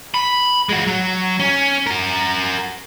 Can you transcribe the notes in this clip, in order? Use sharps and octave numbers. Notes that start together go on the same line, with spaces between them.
B5
G#3 F#4
F#3
C#4
F#4 A#4